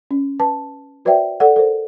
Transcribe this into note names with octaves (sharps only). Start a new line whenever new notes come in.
C#4
B4 A5
F#4 B4 C5 D5 E5 G5
A4 D5 F#5
A4 A#4 C5